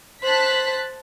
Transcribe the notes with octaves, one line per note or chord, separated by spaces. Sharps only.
C5 A5 F#6 B6